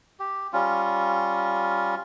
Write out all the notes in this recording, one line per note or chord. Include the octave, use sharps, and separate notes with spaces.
G4
G3 C#4 F4